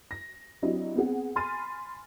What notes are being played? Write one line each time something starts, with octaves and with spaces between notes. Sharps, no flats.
A#6
F#3 C4 D4 E4 G4 D#5
B3 C4 G#4 F#5
G#5 B5 C6 F6 A6 D#7